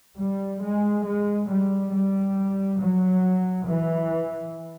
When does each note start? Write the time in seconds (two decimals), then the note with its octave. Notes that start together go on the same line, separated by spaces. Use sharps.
0.18 G3
0.62 G#3
1.05 G#3
1.49 G3
1.92 G3
2.81 F#3
3.68 E3